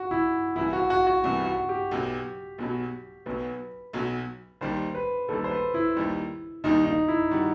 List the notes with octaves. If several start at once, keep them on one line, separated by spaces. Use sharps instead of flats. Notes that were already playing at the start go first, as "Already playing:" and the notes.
Already playing: F#4
E4
C2 C3 E3 E4
F#4
F#4
F#4
C2 C3 E3
F#4
G4
B1 B2 F#3
B1 B2 F#3
B1 B2 F#3 B4
B1 B2 F#3
D#2 D#3 G3 C5
B4
D#2 D#3 G3 A4
C5
B4
E4
D#2 D#3 G3
D#2 D#3 G3 D#4
D#4
E4
D#3 G3 D#4 F#4